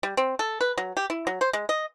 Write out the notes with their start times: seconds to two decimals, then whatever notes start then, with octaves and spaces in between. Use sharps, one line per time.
0.03 G3
0.17 C4
0.39 A4
0.61 B4
0.78 F#3
0.97 G4
1.10 E4
1.27 F#3
1.41 C5
1.53 G#3
1.69 D#5